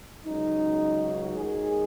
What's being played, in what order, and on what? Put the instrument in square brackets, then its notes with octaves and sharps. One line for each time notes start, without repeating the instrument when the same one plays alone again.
[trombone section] C#2 C#3 F#3 D#4
D#2 D#3 G#3 G#4